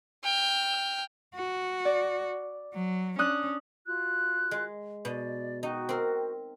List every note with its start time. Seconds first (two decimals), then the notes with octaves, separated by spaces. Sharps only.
0.24 G5 F6
1.35 F#4
1.85 D5
2.74 F#3
3.18 C#4 D4 D#6 F#6
3.86 F4 F#4 F#6
4.51 G#3
5.05 B2 D5 D#5
5.63 D#4 F#4 G5
5.89 C4 A#4